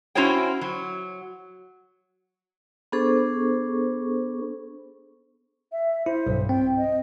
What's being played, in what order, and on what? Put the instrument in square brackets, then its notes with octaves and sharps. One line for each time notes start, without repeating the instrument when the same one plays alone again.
[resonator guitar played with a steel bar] C#4 E4 F#4 C5 C#5 G5
F#3
[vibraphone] B3 D4 G#4 A4 C5 C#6
[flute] E5
[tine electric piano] E4 [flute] C5
[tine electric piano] B1 G2
[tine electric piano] C4 [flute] G5
[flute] D#5